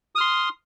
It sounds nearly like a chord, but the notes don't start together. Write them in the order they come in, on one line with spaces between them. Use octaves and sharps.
D#6 F6 C6